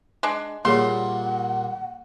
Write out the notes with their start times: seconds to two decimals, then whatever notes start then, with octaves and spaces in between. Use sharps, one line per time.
0.23 G#3 D4
0.65 A#2 G3 A#3 G#4 C#5 F#5 C6